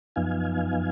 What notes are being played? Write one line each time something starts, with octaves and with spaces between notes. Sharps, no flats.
F#2 F3 B3 D#4 F5 G#5